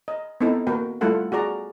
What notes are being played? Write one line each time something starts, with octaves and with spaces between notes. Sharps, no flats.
D#5
B3 C4 D#4 E4 A4
A#3 F#4 B4 G5
G3 A3 E4 F4 A4 F#5
F#4 G#4 D5 A#5